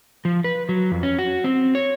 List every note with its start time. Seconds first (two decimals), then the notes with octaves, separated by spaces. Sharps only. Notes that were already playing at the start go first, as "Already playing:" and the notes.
0.25 F3
0.44 B4
0.69 F#3
0.92 F2
1.03 C#4
1.19 F#4
1.44 C4
1.75 C#5